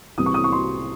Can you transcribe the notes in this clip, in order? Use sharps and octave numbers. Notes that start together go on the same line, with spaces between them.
C2 C3 E3 D#6
C#6
D#6
C#6
C6